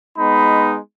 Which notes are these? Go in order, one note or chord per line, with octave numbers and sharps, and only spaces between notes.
G#3 B3 D#4 B5